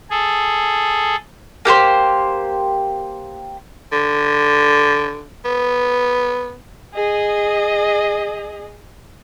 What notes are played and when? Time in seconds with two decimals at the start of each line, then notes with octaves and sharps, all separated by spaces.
0.10 G#4 A4
1.65 A#3 G4 A4 C5
3.92 D3
5.45 B3
6.94 G#4 D#5